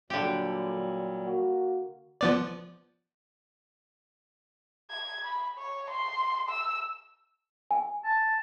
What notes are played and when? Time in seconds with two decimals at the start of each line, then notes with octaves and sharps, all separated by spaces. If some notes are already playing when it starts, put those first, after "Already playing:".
0.10 A#2 D3 F#3 G3 G4
1.26 A#3 F#4
2.21 F3 B3 D5
4.91 G#6
5.25 B5
5.58 C#5
5.90 C6
6.50 E6
7.71 G#5
8.04 A5